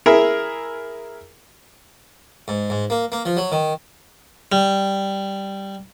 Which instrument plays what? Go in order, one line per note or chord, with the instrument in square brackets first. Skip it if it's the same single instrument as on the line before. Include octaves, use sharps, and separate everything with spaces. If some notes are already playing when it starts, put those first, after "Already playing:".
[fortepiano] E4 G#4 A#4 E5
[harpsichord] G#2
G#2
A#3
A#3
F3
F#3
D#3
G3